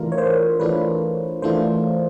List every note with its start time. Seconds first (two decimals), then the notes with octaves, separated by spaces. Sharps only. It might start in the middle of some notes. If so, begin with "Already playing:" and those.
Already playing: E3 A3 D4 F4 A#4
0.12 C#5
0.18 C5
0.60 E3 A3 D4 F4 B4
1.42 E3 A3 D4 F4 C5